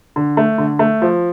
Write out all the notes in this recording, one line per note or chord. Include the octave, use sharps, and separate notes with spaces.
D3
A3
D3
A3
F3